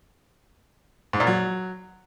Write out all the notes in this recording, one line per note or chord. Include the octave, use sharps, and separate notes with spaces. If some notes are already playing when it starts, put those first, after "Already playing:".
G#2
A#2
F#3